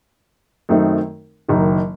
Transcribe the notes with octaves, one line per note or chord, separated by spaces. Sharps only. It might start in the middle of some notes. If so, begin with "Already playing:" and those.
F#2 D#3 A3 C4 D#4
F#1 F#2 D#3